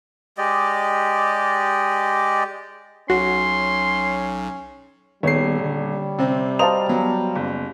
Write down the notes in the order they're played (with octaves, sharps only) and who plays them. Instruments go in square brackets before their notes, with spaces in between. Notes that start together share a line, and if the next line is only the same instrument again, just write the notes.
[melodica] G#3 G4 D5 D#5
[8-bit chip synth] B1 [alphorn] C#4 [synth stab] F#4 [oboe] C6
[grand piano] D#1 C7 [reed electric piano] D#3 B3 G#4 [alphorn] G3 [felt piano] C#5
[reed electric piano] D3
[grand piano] C3 C4
[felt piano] C5 F5 A5 [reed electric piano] D#5 A#5 D#6 [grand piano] F7
[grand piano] F#3 [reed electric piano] B3
[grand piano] F#1